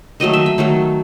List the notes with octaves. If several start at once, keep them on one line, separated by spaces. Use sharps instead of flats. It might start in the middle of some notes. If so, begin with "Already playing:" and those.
D#3 F#3 A3 D#5
E5
E5
D#3 F#3 A3